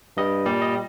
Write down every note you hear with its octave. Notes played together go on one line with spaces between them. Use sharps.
G2 G3 D#5
A#2 G3
D#5